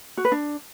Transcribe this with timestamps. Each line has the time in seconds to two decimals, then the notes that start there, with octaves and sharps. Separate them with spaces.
0.17 F#4
0.25 B4
0.32 D4